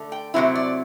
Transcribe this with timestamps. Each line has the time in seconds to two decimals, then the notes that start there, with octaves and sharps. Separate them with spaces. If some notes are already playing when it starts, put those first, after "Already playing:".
Already playing: D3 A3
0.12 G5
0.34 C3 F#3 A3 C4 E4
0.55 D5